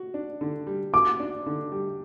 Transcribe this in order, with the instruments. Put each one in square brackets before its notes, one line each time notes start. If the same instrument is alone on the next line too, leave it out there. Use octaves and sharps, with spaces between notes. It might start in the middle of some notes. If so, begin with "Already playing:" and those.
Already playing: [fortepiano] F#4
D4
D3
G3
[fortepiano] F#4 [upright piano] D6
[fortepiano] D4
D3
G3